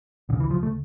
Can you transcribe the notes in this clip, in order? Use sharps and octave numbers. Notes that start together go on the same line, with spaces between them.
D2 C#3 D3
E3
F3
A3